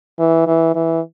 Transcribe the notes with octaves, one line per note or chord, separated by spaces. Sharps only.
E3
E3
E3